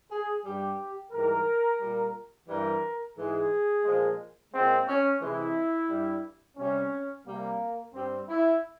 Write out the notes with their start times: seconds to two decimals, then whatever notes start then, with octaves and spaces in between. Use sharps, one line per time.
0.10 G#4
0.44 G2 G3 G4
1.12 G#2 E3 G3 A#4
1.80 A#2 G3
2.48 G2 E3 G3 A#4
3.17 G#2 E3 G#3 G#4
3.85 A#2 F3 G#3
4.53 A#2 G#3 C4
4.87 C#4
5.21 C3 E3 G#3 E4
5.89 G2 G3
6.57 C3 G3 C#4
7.26 C3 G3 A#3
7.93 G2 G3 C4
8.28 E4